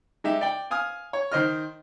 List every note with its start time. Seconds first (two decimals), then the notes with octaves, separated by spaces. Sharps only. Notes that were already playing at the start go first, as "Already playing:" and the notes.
0.24 G#3 D#4 G4 E5
0.41 D5 G5
0.71 F5 G#5 D#6 F6
1.13 C#5
1.32 D#3 C5 D#5 F6